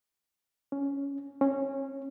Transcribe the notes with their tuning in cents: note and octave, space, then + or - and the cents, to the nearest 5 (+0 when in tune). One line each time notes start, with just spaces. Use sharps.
C#4 +10
C#4 -15